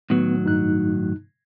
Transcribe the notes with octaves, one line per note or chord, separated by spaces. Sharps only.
A2 D#3 F#3 B3
G2 D#4 F#6